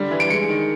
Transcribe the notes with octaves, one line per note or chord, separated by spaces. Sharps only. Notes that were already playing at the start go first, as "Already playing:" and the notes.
Already playing: D3 G3
E3
D7
G#3 C#7
D#3